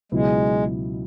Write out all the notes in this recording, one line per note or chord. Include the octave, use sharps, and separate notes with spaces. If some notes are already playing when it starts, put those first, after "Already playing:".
C#2 B2 F#3 G#3 B3 E4